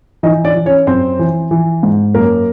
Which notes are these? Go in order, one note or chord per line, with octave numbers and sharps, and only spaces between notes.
E3 D#4 D#5
D4 D5
E3
C#4 C#5
F#2 C4 C5
E3
E3
G#2
F#2 A#3 A#4